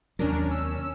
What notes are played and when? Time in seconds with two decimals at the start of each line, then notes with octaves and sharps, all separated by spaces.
0.19 D#2 C3 F#3 C#4 D4 A#4
0.49 C#4 E6